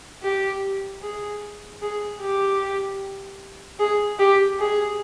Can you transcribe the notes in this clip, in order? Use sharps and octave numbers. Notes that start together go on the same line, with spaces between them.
G4
G#4
G#4
G4
G#4
G4
G#4